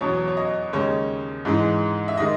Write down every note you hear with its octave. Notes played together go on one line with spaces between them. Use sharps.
E2 B2 F#3 C#5
C#5
D#5
D#2 C#3 G#3 C#5
G#2 E3 G#3
E5
D#3 G#3 D#5